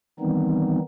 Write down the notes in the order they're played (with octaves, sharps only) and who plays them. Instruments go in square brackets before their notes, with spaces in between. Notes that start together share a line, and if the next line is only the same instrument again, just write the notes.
[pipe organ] D#3 E3 G3 B3 C4 D#4